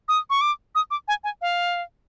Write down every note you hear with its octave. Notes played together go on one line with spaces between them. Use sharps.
D#6
C#6
D6
D#6
D6
G#5
G#5
F5